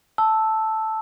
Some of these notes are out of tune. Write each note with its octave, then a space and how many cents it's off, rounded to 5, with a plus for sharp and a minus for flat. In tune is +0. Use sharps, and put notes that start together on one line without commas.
A5 +0 E6 -5